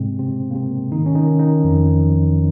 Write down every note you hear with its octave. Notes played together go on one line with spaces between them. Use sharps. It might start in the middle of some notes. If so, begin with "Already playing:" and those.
Already playing: G#2 C3 G#3 C4
C3 C4
A#3
C3 C4
D#3 D#4
C#4
D#3 D#4
D#3 D#4
F2 F3